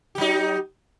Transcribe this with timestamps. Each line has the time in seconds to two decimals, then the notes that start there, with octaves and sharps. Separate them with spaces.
0.15 G4
0.18 F#3
0.21 D#4